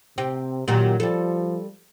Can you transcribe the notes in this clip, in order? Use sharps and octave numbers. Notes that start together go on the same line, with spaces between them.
C3 C4 G4
A#2 D#3 F#3 G4
F3 G3 A4